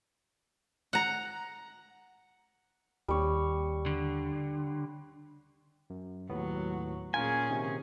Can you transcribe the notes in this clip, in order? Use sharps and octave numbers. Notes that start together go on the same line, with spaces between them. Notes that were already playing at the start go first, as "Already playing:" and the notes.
F#5 A#5
D#2 G3 C#5
D3
F#2
D#2 A2 F#3 B3
A#2 C#4 F4 G#4 A#4 G#5
C3 D#3